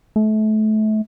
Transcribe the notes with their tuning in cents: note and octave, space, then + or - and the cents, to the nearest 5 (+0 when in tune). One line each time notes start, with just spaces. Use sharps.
A3 -30